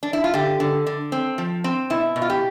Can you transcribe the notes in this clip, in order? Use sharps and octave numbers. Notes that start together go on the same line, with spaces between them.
D4
E4
F4
D3 G4
D3
D3
C4
F3
C4
B2 E4
B2
F4
G4